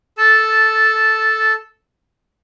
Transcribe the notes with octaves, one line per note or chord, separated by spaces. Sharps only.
A4 A5